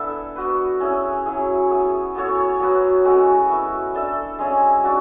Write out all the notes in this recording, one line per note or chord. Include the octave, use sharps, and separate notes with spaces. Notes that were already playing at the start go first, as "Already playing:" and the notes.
Already playing: B3 D4 E4 A4 B4 D5 E5
B3 F#4 B4
C#4 E4 G#4
F#3 C#4 E4 G#4
B3 E4 G#4 C#5
B3 F#4 A4 C#5
F#3 B3 F#4 B4
G#3 C#4 F#4 A4
B3 E4 B4 E5
D4 A4 E5
G#3 C#4 E4
D4 F#4